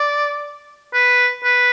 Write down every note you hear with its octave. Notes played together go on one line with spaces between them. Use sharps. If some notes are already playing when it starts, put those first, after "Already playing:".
Already playing: D5
B4
B4